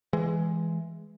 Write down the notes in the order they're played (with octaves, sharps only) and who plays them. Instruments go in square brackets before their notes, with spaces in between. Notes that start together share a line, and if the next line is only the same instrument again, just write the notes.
[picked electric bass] E3 G#3